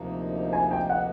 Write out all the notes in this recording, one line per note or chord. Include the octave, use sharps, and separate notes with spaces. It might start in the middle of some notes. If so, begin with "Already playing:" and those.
Already playing: D2 C3 F3 A#3 D#4
G#5
G5
F#5